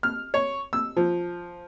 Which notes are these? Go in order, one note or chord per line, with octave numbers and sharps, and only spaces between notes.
F6
C#5
E6
F3